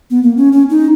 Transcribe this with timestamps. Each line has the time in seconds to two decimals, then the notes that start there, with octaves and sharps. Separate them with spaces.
0.10 B3
0.23 A#3
0.37 C#4
0.53 C#4
0.70 D#4